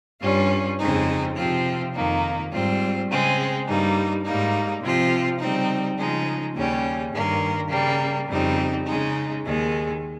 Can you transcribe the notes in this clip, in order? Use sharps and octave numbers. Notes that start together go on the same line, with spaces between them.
G2 G3 C#4 F4
F2 C#3 G#3 C4 D#4
C3 F3 C4 F4
F2 D#3 A#3 D#4
G#2 G3 C4 F4
C#3 G#3 C4
G2 G3 A#3 D#4
G#2 G3 A#3 D#4
C3 F3 C4 F4
C#3 G3 C4 D#4
C#3 F3 G#3 D#4
D#2 C#3 G3 C#4
G2 D#3 A#3
C#3 G3 A#3
F2 C#3 G3 C4 D#4
C#3 G#3 D#4
D#2 D#3 G#3